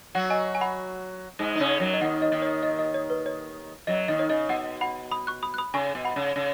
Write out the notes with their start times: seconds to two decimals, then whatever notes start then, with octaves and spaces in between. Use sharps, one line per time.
0.15 F#3 F#4 F#5
0.30 D#5 G#5
0.55 G#5
0.61 F#5 B5
1.39 G#2 G#3
1.56 D#4
1.60 C#3 C#4
1.80 F#2 F#3
1.93 D#5
2.01 D#2 D#3 F#5
2.22 D#5
2.32 D#2 D#3
2.42 C#5
2.63 D#5
2.79 D#5
2.94 C#5
3.10 B4
3.26 C#5
3.87 F#2 F#3 D#5
4.08 D#2 D#3 D#5
4.19 C#5
4.29 C#3 D#5
4.49 B2 F#5
4.81 F#5 B5
5.11 B5 D#6
5.27 C#6 F#6
5.43 B5 D#6
5.54 F#6
5.58 B5 D#6
5.74 C#3 G#5 C#6
5.95 B2
6.05 F#5 B5
6.16 C#3
6.36 C#3